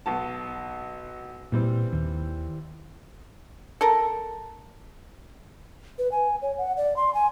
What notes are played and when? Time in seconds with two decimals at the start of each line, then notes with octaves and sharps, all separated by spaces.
0.06 B1 B2 A5
1.52 A#2 E3 G3 C4
1.93 D#2
3.81 A4 A#4
5.99 B4
6.12 G#5
6.42 C#5
6.58 F#5
6.77 D5
6.96 C6
7.14 G#5